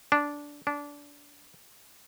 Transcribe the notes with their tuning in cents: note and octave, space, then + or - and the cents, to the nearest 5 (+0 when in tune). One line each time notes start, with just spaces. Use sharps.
D4 -10
D4 -20